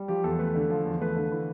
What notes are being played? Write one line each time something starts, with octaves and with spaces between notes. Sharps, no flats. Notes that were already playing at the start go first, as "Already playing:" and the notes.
Already playing: G3
F3 G4
E2 A4
A3 B4
D3
F3
E2
A3 B4
D3
E3